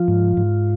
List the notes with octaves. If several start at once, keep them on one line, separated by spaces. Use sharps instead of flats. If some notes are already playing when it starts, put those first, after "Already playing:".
Already playing: F3 F4
G#2
G#2